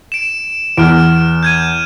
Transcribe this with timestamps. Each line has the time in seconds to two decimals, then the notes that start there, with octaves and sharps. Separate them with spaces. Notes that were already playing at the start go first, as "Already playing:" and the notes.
0.12 D7 E7
0.78 E2 F6 D7
1.43 G6 G#6 D#7